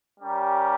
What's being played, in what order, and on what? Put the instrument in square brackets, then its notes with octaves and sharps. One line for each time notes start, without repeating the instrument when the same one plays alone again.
[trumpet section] G3 C#4 G4 A#4